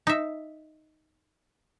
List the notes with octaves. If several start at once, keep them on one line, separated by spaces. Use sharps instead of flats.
D#4 E5